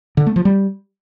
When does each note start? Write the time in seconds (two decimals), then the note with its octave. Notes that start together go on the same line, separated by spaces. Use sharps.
0.17 D3
0.27 A3
0.36 F3
0.45 G3